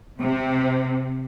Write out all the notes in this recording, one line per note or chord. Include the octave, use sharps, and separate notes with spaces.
C3